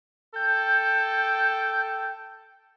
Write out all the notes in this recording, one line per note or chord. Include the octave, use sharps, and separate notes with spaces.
A4 G5 G6